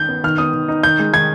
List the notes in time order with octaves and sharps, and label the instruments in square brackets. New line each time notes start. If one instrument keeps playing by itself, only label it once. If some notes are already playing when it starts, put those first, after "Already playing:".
Already playing: [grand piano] D#3 G6
B3
D#3 F6
B3 D#6
D#3
D#4
D#3 G6
G#3
D#3 G#6